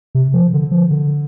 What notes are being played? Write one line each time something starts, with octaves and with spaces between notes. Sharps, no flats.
C3
F3
D3
F3
D3